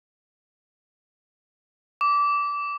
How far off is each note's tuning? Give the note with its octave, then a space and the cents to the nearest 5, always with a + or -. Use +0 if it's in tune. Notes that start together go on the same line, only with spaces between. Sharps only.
D6 -20